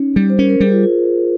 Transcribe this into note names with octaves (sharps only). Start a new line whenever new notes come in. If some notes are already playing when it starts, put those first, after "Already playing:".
Already playing: C#4 D#4
G3
C5
C#4 A#4
A#4
G3 G#4
F4
F4